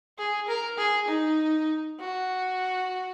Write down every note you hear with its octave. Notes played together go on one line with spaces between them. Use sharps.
G#4
A#4
G#4
D#4
F#4